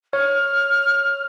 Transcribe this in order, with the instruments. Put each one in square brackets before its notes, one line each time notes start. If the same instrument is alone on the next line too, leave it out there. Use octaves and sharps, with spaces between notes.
[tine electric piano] C#5 [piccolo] F6